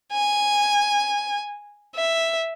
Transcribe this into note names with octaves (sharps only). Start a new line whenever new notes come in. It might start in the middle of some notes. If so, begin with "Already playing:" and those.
G#5
E5